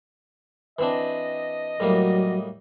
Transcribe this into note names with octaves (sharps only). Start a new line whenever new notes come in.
E3 C4 D4 D#5
A2 F#3 G3 A#3